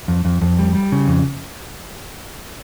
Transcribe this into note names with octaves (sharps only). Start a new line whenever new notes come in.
F2
F2
F2
G3
G3
C#3
F2